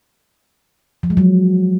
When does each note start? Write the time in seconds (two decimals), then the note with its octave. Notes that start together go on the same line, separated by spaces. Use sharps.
1.03 F3
1.10 G#3
1.17 F#3